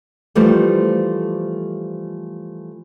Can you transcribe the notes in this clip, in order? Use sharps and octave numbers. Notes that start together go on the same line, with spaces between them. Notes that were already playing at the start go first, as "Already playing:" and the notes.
E3 F3 G3 A3 F4 C5